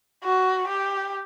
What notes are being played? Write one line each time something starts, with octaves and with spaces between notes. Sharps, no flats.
F#4
G4